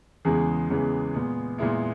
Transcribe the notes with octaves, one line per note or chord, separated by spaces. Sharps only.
E2 C#3 E3 G#3 B3 G#4
E2 C#3 E3 G#3 B3
A#2 G#3 B3
A#2 G#3 B3 E4